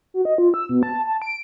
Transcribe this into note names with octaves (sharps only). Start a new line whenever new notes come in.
F#4
D#5
F4
E6
B2
A5
A5
D7